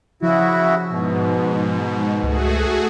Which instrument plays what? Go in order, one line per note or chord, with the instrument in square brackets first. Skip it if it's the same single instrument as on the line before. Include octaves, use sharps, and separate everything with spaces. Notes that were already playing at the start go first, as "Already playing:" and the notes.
[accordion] C#3 E4 F#4 [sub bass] F3
[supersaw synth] G#2 [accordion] B2
[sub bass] C#2 [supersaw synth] A3 F#4 G#4